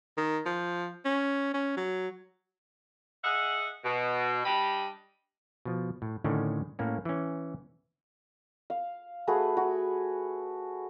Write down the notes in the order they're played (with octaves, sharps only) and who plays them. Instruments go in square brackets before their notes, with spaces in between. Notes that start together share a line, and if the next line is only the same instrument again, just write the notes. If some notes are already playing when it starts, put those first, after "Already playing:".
[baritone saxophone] D#3
F3
C#4
C#4
F#3
[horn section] G#4 D#5 E5 F#5
B2
G3 D4 G4 D#5 B5
[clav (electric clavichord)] B2 F3
A2
A2 D3 D#3 C#4
A2 A#3 C#4
E3 C#4
[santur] F5
A3 F#4 G#4 B4
F#4